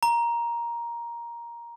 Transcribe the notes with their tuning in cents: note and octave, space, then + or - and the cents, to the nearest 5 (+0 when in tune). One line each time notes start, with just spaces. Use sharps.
A#5 +10